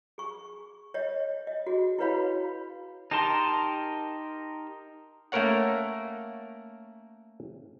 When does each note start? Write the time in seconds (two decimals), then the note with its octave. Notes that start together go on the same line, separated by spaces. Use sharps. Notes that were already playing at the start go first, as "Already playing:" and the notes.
0.18 G#4 C#6
0.94 C#5 D#5
1.47 D#5
1.67 F#4 G#4
1.99 E4 F#4 B4 C#5 F5 B5
3.11 D#4 G4 A#4 A5 C6
5.32 A3 A#3 C#4 A#4 C#5 F#5